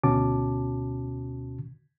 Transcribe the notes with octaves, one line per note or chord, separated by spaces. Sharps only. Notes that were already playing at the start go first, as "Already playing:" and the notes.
D2 B2 C#4 F#4 A5 D6